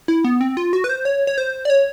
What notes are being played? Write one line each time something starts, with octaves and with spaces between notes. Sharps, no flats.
E4
B3
C4
F4
F#4
B4
C5
C#5
C#5
C5
D5
C#5